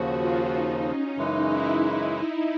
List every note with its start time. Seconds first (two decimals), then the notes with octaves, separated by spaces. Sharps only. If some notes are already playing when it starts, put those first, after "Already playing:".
Already playing: D#2 C#3 F3 F#4
0.20 F4
0.53 D#4
0.85 C#4
1.17 F#2 C#3 E3 G#3 D#4
1.50 E4